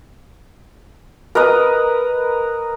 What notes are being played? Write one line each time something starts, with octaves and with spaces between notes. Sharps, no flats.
A#4 B4 D#5